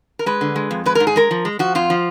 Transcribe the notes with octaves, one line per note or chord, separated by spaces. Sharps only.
A#4
G#3 B4
D3
G#3
F2
G#3 B4
G#2 A#4
G#4
G#3 A#4
F3
G#3
F3 F#4
F2 F4
F3